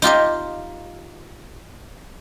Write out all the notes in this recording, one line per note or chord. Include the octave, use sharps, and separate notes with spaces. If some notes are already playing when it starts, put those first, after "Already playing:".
D#4 F4 G4 D#5